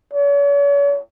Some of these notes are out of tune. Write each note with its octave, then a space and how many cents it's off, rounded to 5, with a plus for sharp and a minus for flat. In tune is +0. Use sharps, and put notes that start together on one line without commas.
C#5 +40